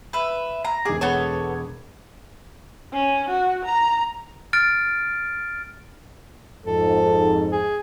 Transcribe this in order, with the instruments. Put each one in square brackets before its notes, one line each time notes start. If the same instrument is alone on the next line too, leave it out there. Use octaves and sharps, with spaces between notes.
[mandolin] B4 E5
A#5
[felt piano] E1 G#3 D6 [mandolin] G#4
[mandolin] B3 A4 C#5
[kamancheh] C#4
F#4
A#5
[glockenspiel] F6 A6 D7
[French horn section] F2 G#2 [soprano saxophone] A4
[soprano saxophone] G#4